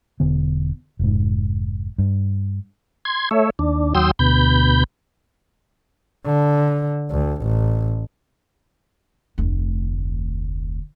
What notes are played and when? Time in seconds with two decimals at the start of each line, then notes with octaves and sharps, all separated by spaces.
0.20 E1 D3 B3
0.99 F1 G#2
1.98 G2
3.05 C6 G#6
3.31 A3 C#5 E5
3.59 D#2 D4
3.95 D#2 F#3 G5 C6 D#6 E6
4.19 D2 B2 B5 G6
6.26 D3
7.10 D2
7.42 A1
9.38 F1 D2